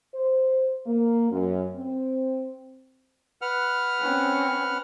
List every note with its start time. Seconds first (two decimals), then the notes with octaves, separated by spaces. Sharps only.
0.14 C5
0.86 A#3
1.31 F#2
1.75 C4
3.42 B4 F#5 F6
4.00 C4 C#4